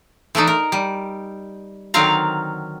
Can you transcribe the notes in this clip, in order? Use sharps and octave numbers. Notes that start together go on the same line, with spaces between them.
E3 A3 D4 D#4
A#4
G3
D3 D#3 F#3 C4 F5 A#5